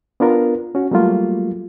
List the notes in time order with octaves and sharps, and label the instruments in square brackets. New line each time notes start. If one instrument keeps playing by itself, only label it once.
[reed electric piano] B3 D4 F4 A#4
C#4 F#4
F#3 G3 A3 A#3 F4